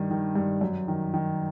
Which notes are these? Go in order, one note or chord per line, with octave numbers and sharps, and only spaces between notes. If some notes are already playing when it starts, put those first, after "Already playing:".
Already playing: G2 D#3
D#3
G2
F#2
D#3
D#3